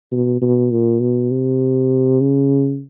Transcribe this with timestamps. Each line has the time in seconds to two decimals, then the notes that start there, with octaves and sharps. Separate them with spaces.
0.12 B2
0.41 B2
0.71 A#2
1.01 B2
1.31 C3
2.21 C#3